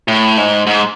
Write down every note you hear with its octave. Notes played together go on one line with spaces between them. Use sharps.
A2
G#2
G#2